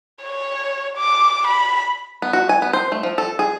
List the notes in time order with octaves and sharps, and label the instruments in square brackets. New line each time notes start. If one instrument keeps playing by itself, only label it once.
[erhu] C#5
D6
B5
[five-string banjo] B3
F#4
G#5
B3
C5
A3
F3
A4
G#4